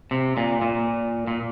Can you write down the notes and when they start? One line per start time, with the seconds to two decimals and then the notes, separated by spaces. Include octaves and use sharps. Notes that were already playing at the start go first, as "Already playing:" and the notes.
0.11 C3
0.37 A#2
0.62 A#2
1.27 A#2